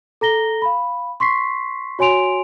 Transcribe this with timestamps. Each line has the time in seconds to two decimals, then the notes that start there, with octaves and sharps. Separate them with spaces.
0.21 A4 A#5 A#6 G7
0.62 F5 B5
1.20 C6 C#6 B6 C7
1.99 F#4 C#5 G#5 C6 D7 F7